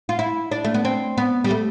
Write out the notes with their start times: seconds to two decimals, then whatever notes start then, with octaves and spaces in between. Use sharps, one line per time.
0.09 F4
0.19 E4
0.51 D4
0.64 A3
0.74 B3
0.85 C4
1.17 B3
1.44 G3
1.51 A3